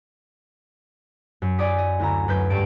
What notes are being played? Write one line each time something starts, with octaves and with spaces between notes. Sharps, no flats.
F#2
D5 G#5 D6 D#6 B6 C#7
D#5
D2 E4 A#5
F#2 B4 G6
G2 A5 D7